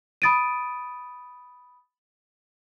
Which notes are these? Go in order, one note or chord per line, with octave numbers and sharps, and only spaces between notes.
B5 D#6 A6 D7 D#7